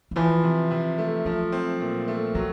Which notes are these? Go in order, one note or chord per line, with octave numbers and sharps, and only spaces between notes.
D#3
E3 F3
C3
C3
A3
F3 F#3
C4
A#2
A3
F#3 B3